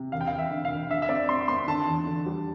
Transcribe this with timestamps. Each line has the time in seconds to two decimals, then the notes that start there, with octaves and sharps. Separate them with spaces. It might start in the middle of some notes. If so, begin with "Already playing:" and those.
Already playing: C3
0.12 E1 F5
0.21 G5
0.27 F5
0.32 E1
0.39 E5
0.51 D3
0.65 F5
0.71 E1
0.91 D3 E5
1.02 E5
1.09 C4 D5
1.29 C4 C6
1.48 C4 C6
1.68 D3 A5
1.87 E2
2.07 D3
2.26 G3